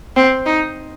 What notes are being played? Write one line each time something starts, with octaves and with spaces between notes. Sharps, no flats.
C4
D#4